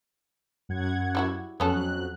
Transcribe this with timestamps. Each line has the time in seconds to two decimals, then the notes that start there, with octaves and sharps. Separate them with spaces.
0.69 F#2 F#5 G#6
1.15 G3 E4 F#4
1.60 F2 F#3 B3 C#4 A4 F#6